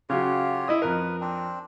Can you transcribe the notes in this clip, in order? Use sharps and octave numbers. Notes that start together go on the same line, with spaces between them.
C#3 F#3 F4 G4 C#5
E4 D#5 D#6
F2 A#4 B4
C4 D4